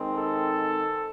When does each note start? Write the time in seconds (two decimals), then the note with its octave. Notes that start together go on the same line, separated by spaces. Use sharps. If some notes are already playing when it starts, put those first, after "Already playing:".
Already playing: D#3 G#3 C4
0.17 A4